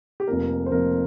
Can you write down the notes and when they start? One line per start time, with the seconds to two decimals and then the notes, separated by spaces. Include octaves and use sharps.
0.20 G4
0.27 F1 F2 F3 A#3 A#4
0.66 C5
0.72 F1 F2 F3 A#3 A#4